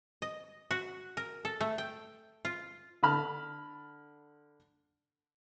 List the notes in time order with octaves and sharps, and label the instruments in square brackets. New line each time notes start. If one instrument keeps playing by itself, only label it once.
[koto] D#5
F#4
A#4
A4
A3
G5
F4
[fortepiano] D3 A5 B5 F6